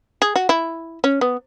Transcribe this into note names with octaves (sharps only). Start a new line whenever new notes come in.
G#4
F#4
E4
C#4
B3